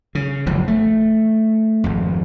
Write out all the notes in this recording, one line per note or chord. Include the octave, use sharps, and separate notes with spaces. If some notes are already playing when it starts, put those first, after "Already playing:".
C#3
F#1 E2 G#2 F3
A3
G#1 F2